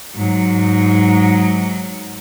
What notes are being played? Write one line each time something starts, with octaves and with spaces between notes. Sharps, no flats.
G#2 F#3